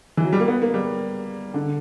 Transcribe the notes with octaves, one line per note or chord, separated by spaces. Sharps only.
E3
F#3
G3
A#3
B3
A#3
G3
D3